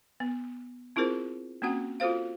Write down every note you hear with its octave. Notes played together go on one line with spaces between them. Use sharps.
B3
C4 E4 F4 G#4 A#4 C5
A#3 C4 C#4 F#4 F#5
F4 F#4 A4 C5 F5